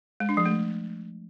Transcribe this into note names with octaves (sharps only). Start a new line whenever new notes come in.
G#3
D4
F3
A3